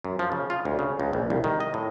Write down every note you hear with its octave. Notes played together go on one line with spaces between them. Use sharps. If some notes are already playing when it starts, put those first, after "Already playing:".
F#2
F3
C#3
F4
D2
C#3
C#2
A#1
C2
D#3
D#5
A2